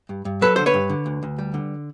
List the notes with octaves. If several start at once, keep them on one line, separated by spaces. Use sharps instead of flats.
G2
G2
F#3 A4 B4
D3 C5
B4 C#5
G2
D3
D2
D2
G3
D3